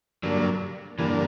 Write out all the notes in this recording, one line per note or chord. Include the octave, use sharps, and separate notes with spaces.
G2 D3 F#3 A#3
G2 D3 E3 A#3